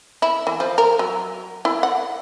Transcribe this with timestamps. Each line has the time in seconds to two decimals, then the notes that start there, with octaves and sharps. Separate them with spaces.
0.22 E4
0.47 E3
0.60 F3
0.78 A#4
0.99 F#3
1.65 E4
1.83 F#5